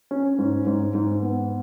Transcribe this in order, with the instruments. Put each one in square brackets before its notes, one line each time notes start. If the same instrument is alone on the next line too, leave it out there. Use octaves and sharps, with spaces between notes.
[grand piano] C#4
G#2
G#2
G#2
B3